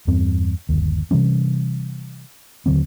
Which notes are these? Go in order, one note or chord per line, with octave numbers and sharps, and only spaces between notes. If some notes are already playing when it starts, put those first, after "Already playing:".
E2 G2 C4
G1 D#2
C3 E3 G3 C#4
D#2 D3 F#3 C4